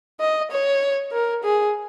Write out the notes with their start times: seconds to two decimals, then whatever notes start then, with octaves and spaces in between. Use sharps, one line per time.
0.20 D#5
0.51 C#5
1.12 A#4
1.44 G#4